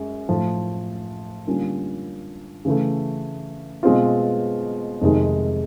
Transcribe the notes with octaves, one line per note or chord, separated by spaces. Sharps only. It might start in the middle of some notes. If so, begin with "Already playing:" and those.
Already playing: F#2 G#3
A2 F3 A3
D3 G3 A#3 C#4 F4
C#3 E3 A3
B2 G#3 C4 F4
F2 C3 D#3 G#3